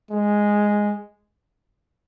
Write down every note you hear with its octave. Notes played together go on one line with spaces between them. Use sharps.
G#3